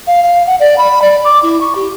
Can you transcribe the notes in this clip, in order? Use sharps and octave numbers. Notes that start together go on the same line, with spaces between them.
F5
F5
F#5
D5
B5
D5
D6
E4
C#6
G4